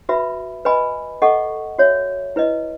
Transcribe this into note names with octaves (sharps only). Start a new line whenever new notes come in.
F#4 B4 E5 B5
B4 D#5 G#5 B5
A4 D#5 F#5 C#6
F#4 C#5 E5
E4 B4 D#5